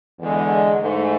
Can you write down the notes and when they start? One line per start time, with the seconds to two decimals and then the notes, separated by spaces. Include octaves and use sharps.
0.19 E2 D3 G#3
0.80 G#2 E3 A3